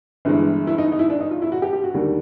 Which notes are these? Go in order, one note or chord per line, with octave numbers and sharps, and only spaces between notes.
G1 G2 E3 G#3
E4
D#4
D#4
E4
D4
D#4
F4
E4
F#4
G4
G4
F#4
D#2 D3 G3 A#3